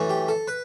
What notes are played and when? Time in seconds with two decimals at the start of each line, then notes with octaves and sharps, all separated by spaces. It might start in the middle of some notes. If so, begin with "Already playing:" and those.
Already playing: F#2 E3 A3
0.09 G4
0.28 A4
0.48 B4